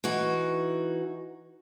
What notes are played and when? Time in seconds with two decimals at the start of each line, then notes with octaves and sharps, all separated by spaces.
0.04 E3 D#4 F#4